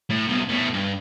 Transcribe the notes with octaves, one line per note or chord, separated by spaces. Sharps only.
A2
C2 B2
B2 A3
G2